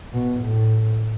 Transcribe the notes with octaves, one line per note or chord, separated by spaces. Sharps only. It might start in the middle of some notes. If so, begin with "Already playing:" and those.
B2
A2